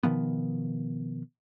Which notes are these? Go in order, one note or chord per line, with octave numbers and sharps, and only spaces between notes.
B2 D#3 F3 B3